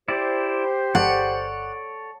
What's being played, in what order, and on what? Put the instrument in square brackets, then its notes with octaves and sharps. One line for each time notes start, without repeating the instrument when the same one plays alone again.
[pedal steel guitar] E4 D5 [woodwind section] G4 C5
[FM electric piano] G1 [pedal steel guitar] A4 C#5 D5 [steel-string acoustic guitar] F#5